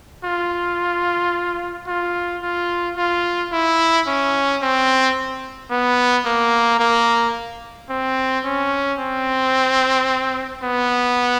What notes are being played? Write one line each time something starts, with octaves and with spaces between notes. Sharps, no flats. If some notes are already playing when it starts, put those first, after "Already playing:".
F4
F4
F4
F4
E4
C#4
C4
B3
A#3
A#3
C4
C#4
C4
B3